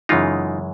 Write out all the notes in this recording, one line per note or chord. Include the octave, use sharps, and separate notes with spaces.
F#2 C#3 E3 G#3 D#4 F4